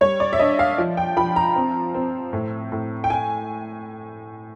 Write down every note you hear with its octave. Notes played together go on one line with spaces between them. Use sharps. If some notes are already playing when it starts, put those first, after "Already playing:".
G3 C#5
D5
E5
D4 D#5
F5
F3
G5
F3 B5
A#5
C4
C4
A2
A2
G5
G#5